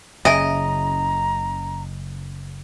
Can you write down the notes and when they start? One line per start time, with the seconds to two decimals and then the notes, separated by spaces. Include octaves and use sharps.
0.25 F#1 C#3 D#5 E5 G#5 A#5